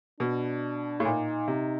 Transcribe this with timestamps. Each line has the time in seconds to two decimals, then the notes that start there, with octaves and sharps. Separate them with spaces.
0.20 B2 D4
1.00 A2
1.05 A#2 D#4
1.47 C3